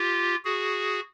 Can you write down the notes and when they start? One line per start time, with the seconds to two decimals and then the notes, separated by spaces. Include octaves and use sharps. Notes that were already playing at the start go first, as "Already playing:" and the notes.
Already playing: F4 G4
0.45 F#4 G#4